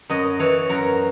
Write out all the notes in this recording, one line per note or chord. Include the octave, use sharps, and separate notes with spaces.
F#2 D#5
E3 C#5
F#2 A#4